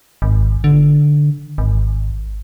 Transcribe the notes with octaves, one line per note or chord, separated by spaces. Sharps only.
G#1
D3
G#1